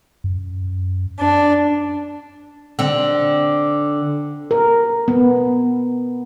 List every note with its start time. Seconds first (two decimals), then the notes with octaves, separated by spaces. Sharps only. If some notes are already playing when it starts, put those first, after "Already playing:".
0.24 F#2
1.19 D4
2.79 D3 C4
4.51 A#4
5.08 B3